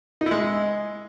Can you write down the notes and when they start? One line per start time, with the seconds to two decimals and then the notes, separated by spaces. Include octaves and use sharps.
0.21 D#4
0.26 E4
0.31 G#3